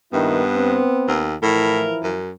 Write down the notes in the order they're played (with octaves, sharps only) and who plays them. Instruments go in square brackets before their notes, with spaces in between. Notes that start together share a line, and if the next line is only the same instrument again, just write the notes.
[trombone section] A#1 D#3 E4 [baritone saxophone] G2 [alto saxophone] B3
[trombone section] C4
[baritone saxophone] D#2
[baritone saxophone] A2 [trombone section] E3 F3 E4 [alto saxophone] A#4
[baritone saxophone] F#2